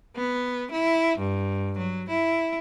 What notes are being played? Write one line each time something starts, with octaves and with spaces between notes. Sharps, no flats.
B3
E4
G2
F#3
E4